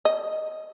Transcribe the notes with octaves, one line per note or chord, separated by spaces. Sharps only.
D#5